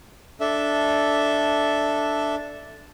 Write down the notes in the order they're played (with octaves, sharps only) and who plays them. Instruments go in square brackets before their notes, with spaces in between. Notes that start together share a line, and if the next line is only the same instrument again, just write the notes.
[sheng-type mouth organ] D4 A4 E5